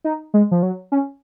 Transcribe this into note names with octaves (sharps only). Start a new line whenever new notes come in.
D#4
G#3
F3
F#3
C#4